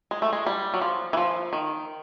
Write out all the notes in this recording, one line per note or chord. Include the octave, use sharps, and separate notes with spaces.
G#3
A3
G#3
G3
F#3
F3
E3
F3
D#3